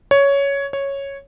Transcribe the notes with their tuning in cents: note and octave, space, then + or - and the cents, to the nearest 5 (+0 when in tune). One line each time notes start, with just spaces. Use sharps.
C#5 +10
C#5 -5